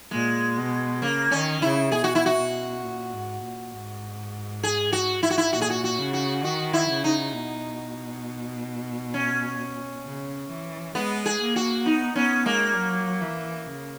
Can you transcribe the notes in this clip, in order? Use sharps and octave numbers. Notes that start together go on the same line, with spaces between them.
A#2 G#3
B2
C#3 A#3
D#3 C#4
C#3 E4
B2 G#4
F#4
E4
F#4
B2
A#2
G#2
A#2
G#2
G#4
F#4
E4
F#4
E4
A#2 F#4
G#4
F#4
F#4
C#3
F#4
D#3 F#4
E4
C#3
D#4
B2
C#4
C#3
E3
G#3 B3
G#4
A#3
F#4
B3 D#4
B3 C#4
G#3 A#3
F#3
E3
C#3